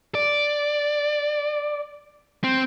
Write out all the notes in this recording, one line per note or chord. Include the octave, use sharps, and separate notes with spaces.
D5
C4